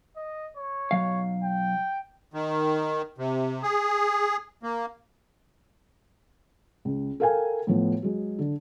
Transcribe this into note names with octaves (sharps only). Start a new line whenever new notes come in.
D#5
C#5
B1 F#3 F5
G5
D#3
C3
G#4
A#3
C#2
A4 A#4 F5 G5 G#5
A2 F3 B3
F#3 G#3
D3